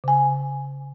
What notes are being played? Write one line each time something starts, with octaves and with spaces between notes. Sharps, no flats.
C#3 G#5